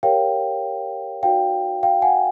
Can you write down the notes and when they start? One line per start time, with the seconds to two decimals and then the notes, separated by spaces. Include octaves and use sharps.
0.03 G4 A#4 C#5 F5 G5
1.23 D#4 F#4 B4 D5 F5 G5
1.83 F5 G5
2.02 F#5 G#5